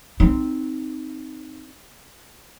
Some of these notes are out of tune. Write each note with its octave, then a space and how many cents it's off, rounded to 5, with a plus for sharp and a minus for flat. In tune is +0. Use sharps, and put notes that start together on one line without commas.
C4 +0 D#4 +0